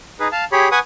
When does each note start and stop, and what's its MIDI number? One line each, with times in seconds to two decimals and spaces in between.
0.20 0.28 63
0.20 0.28 68
0.20 0.28 71
0.32 0.44 77
0.32 0.44 81
0.52 0.68 67
0.52 0.68 68
0.52 0.68 73
0.52 0.68 83
0.71 0.79 71
0.71 0.79 78
0.71 0.79 80
0.71 0.79 85
0.71 0.79 87